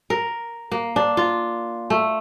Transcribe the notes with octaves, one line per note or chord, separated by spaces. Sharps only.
A#4
A#3
D4
F4
A3